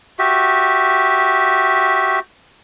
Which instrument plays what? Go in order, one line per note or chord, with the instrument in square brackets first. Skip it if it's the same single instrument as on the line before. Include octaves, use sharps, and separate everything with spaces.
[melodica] F#4 G4 E5